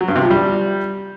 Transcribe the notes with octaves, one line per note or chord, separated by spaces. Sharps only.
F#3
G2
C3
F3
G3